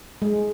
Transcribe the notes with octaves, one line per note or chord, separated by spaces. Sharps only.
G#3